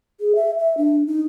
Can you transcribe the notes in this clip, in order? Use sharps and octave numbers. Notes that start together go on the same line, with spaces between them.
G#4
E5
E5
D4
D#4